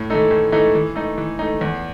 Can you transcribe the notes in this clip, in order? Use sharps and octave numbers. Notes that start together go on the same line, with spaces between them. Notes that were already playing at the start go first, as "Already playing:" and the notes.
Already playing: A2
E3 A3 D#4 A4
A2
E3 A3 D#4 A4
E3
A3 D#4
E3
A3 D#4
E2